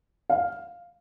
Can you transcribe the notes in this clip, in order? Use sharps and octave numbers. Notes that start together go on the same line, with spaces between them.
F5